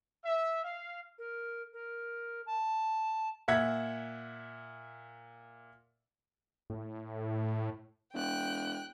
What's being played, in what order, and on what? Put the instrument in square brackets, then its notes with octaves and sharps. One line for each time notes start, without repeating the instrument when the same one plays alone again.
[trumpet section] E5
F5
[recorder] A#4
A#4
A5
[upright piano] A#2 E5 F#5 G#6 B6
[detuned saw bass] A2
[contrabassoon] E1 [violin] G5 F#6